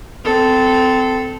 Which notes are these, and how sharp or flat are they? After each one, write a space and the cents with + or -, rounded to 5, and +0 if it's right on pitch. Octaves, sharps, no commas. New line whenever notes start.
C4 -25 A4 +0